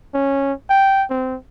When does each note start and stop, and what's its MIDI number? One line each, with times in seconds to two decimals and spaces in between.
0.14 0.53 61
0.69 1.05 79
1.10 1.37 60